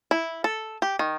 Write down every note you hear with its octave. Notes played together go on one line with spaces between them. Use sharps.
E4
A4
G4
D#3